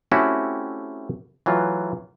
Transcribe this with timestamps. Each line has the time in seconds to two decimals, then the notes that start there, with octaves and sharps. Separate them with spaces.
0.12 A3 C4 C#4 E4 F#4 G4
1.46 E3 F#3 A3 F4